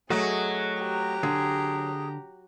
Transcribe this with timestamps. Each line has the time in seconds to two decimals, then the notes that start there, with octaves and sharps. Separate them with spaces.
0.10 F#3 A3 F#4 G#4 D#5
0.80 G4 A#5
1.23 D3 G#4